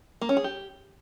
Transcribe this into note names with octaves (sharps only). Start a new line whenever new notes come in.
A#3
C#4
G#4
G4